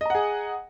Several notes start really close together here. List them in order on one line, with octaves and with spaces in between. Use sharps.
D#5 A#5 F#5 G#4